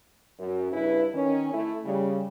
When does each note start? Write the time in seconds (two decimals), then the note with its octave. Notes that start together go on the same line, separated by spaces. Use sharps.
0.39 F#2
0.72 G2 C#3 E4 B4
1.14 D#3 C#4
1.53 A3 E4
1.85 C#3 G3